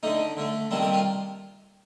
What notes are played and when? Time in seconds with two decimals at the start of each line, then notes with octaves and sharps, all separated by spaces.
0.03 D3 A3 D#4
0.37 D3 A3
0.71 C3 D#3 G3 A#3 A4
0.82 G4
0.93 F4